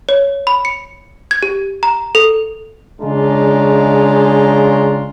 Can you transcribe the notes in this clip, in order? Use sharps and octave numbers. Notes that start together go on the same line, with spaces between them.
C#5
B5
C#7
G#6
G4
A#5
A4
C#3 G#3 D4 F4 A#5